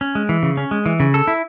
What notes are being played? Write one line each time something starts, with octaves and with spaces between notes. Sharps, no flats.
C#4
G#3
E3
C#3
C#4
G#3
E3
C#3
A4
E4